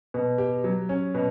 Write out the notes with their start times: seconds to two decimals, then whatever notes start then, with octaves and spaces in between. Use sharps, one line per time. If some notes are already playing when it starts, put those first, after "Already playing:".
0.14 B2
0.38 G4
0.64 F#3
0.89 C#4
1.14 B2